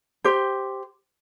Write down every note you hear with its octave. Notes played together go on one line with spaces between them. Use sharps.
G4 C5